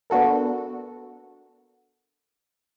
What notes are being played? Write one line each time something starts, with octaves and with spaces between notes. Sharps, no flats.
B3 D4 F#4 A4 A#4